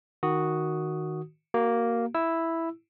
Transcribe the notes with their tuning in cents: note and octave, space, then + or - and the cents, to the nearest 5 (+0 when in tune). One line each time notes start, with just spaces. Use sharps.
D#3 +0 F#4 +0 D#6 +0
A#3 +0 F#4 +25
E4 +0 E6 +0